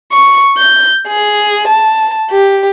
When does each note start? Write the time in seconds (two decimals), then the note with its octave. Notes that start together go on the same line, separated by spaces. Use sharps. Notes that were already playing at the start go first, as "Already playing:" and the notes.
0.12 C#6
0.57 G6
1.07 G#4
1.67 A5
2.30 G4